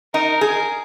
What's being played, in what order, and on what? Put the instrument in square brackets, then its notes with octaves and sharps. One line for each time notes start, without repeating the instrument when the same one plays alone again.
[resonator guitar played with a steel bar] D#4 [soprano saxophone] A#4
[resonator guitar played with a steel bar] G#4 [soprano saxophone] A#4